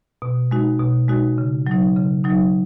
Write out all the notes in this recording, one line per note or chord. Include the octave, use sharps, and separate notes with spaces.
B2
G#3 D#4 F#4
B2
G#3 D#4 F#4
C#3
F#3 D#4
C#3
F#3 D#4